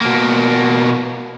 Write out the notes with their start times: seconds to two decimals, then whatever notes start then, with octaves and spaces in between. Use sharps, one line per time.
0.01 B2 A#3